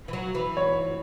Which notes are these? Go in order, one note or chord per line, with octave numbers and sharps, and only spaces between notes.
E3
F#3
E3
C#5